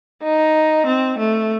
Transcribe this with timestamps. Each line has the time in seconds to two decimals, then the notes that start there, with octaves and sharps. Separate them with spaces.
0.23 D#4
0.87 C4
1.19 A3